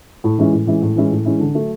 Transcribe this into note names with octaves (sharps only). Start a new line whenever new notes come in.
A2
E3 G#3 C#4 E4
A2
E3 G#3 C#4 E4
A2
E3 G#3 C#4 E4
A2
E3 G#3 C#4 E4
D3
F#3 A3